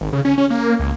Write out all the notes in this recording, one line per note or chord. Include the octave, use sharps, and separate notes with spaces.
G#1
C#3
C#4
C#4
A#3
C#2